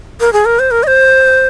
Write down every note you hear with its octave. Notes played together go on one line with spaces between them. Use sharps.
A#4
G#4
A#4
C5
A#4
D#5
C5